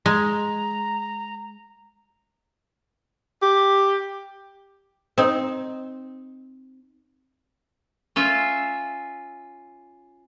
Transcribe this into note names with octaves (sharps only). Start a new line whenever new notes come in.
G#3 A#5
G4
C4 D#4
C#4 F4 E5